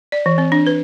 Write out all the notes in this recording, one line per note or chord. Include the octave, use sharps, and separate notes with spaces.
D5
E3
C4
D4
B4